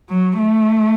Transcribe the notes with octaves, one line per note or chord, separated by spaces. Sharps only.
F#3
A3